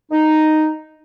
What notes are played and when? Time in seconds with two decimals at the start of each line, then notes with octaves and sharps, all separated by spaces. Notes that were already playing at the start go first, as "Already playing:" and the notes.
0.11 D#4